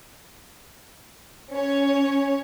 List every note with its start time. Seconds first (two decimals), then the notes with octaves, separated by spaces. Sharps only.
1.52 C#4 C#5